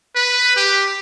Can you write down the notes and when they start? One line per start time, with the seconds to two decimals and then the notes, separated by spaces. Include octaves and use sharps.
0.16 B4
0.57 G4